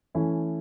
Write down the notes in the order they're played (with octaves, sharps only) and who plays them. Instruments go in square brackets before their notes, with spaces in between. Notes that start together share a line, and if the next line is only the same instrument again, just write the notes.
[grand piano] E3 A3 C#4 E4